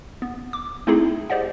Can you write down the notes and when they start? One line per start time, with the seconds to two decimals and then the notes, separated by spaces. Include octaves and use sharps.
0.22 B3
0.53 D6
0.87 A3 C4 D#4 E4 G#4
1.30 G4 G#4 C5 D5 D#5 F#5